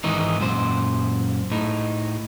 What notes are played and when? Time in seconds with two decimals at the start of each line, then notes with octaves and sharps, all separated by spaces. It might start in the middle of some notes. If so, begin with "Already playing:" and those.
0.04 G#2 D#3 E3 D#4
0.40 F#2 A#2 C5
1.52 A2 D#4